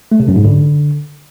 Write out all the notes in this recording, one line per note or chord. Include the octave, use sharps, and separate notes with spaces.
A3
C3
F#2
G#2
D3